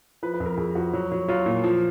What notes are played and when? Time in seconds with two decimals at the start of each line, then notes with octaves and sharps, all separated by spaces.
0.23 F3 B4
0.34 B4
0.40 F2
0.46 A#4
0.57 F2 G#4
0.75 F3 F#4
0.93 F#3
1.12 F#3
1.28 F#3 F4
1.46 A#2
1.64 F3